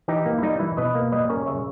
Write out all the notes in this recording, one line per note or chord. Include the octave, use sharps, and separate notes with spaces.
E3 D#4 G4
A#3
E4
G3 D#4
E3 E4
B2 B4 D#5
A#3
G3 B4 D#5
C#4 A#4 C#5
C#3 C#5 E5